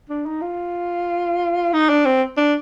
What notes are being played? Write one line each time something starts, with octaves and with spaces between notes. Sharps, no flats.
D4
D#4
F4
D#4
D4
C4
D4